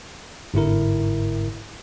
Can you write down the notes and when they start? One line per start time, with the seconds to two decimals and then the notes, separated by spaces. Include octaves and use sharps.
0.54 G1 G#2 E4 A#4